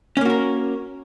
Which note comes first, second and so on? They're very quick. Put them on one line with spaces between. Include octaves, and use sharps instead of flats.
C#4 A#3 F#4 A#4